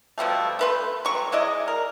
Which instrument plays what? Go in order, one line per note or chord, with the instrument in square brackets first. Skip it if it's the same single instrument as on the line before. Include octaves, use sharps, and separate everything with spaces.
[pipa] B2 F3 G3 A3
A3 B4 C6
F#3 G3 C#6
G#3 E4 D5 D#5
A#4